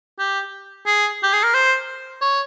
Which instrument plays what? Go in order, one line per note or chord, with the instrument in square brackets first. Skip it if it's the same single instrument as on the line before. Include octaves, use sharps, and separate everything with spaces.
[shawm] G4
G#4
G4
G#4
A#4
C5
C#5